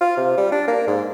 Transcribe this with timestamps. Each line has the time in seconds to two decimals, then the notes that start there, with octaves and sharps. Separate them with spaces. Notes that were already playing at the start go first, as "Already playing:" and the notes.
0.01 F4
0.17 C3
0.37 G3
0.52 D4
0.68 A#3
0.87 G#2